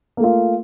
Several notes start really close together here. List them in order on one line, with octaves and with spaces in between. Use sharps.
A#3 A3 F4